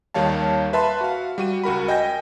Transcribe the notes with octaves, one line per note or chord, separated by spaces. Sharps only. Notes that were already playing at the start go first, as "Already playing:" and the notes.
D#2 D#3 G3 C#5 F5 A5
B4 E5 A5 B5 C6
F#4 F5
G3 F#4 D#7
C#2 F#4 A#4 B5
D#5 G5 G#5 G6 A#6